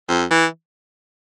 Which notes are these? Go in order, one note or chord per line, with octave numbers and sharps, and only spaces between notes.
F2
E3